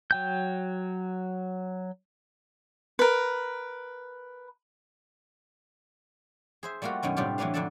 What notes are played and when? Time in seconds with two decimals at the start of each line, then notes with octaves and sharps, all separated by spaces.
0.11 F#3 G5 G6
2.99 A#4 B4
6.63 G#4 C5 E5
6.82 G3 A3 A#3 F4 F#4
7.03 F#2 B2 D#3 C#4
7.17 A2 C3 G3 D4 F4 G4
7.38 E3 F#3 A3 D4 B4 F5
7.54 F2 D3 D4 A4 A5